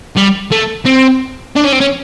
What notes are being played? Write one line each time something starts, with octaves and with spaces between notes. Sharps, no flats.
G3
A3
C4
D4
C#4
C4
C#4